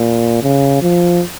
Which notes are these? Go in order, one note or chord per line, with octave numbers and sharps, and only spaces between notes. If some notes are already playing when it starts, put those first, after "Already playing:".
Already playing: A#2
C#3
F3